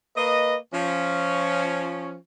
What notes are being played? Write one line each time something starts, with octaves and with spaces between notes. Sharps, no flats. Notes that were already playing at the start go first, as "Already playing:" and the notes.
A#3 B4 D#5
F3 C#4